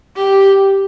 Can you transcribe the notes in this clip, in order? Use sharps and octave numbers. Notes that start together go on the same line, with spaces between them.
G4